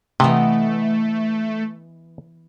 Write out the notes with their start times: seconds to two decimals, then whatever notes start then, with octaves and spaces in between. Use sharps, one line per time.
0.20 C3 E3 A3 B3 D#5